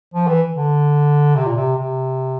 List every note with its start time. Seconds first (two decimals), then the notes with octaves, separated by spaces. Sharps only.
0.14 F3
0.27 E3
0.54 D3
1.35 C3
1.45 A#2
1.55 C3
1.76 C3